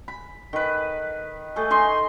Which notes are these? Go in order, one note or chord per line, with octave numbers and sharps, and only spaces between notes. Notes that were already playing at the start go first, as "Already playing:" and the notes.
B5
D#3 B4
A3 G#4 A4
D#4 G#4 C6